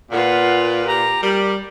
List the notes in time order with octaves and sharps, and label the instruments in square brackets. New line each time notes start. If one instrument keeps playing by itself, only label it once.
[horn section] A#2 [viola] F4 B4 [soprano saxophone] F#5
[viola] G4 [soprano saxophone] A#5
[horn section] G3 [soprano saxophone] A#4